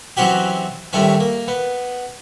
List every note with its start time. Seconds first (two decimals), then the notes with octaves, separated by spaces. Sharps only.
0.17 E3 F#3 C4 C#4 F#4 G4
0.93 D#2 A2 G3 A3 C4 C#4
1.20 A#3
1.48 B3